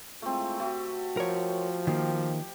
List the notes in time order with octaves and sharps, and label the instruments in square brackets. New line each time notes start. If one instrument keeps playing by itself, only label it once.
[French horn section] G#3 E4 F4 [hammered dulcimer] A3 C4
[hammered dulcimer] A3 G4 [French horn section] F#4
[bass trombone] F3 [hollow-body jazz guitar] A#4 C#5
[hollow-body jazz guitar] D#3 A#3 [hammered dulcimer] G4